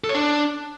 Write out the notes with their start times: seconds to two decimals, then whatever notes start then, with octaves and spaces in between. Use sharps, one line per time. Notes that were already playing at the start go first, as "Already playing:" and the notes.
0.04 A4
0.09 C#5
0.14 D4